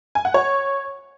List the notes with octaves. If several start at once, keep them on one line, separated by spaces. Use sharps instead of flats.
G#5
F#5
C#5